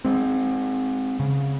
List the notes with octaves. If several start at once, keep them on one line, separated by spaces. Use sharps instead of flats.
G#3 C4
C#3